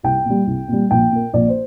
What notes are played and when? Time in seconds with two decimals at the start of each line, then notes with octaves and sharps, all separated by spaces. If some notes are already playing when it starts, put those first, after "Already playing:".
0.03 C2 G5
0.25 A#2 G3
0.47 C2
0.68 A#2 G3
0.91 A#1 G5
1.11 A#2 A#3
1.33 A#1 D5
1.48 C5